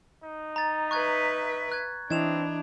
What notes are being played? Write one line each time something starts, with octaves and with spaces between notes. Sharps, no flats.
D#4
A#5 A6
B4 E5 C#6 F#6 G#6
F#6 G#6
E3 C4 D4 E4 D#5 G#6 E7 F7